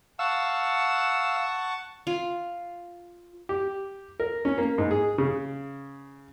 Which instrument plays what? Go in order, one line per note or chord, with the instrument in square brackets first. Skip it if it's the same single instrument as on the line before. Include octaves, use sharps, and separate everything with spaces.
[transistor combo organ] F5 E6 [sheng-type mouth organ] F#5 A5 C#6
[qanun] F4
[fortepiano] G4
A#4
C#4
A#3
G#2
G#4
C#3